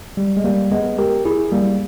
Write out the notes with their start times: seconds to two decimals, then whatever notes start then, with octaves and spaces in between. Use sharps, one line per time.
0.17 G3
0.37 G#3
0.44 G3 A#3
0.71 G#3 B3
0.98 G4 A#4
1.25 E4 G#4
1.52 G3 A#3